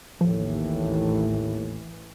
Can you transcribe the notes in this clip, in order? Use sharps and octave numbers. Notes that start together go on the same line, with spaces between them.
A1 D#2 A2 E3 F3